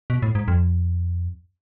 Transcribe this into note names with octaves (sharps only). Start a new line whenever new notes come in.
B2
A2
G#2
F2